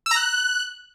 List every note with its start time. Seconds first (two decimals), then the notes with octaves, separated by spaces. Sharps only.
0.06 E6
0.11 A#5
0.16 F#6